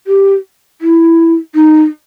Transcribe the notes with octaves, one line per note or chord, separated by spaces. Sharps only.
G4
E4
D#4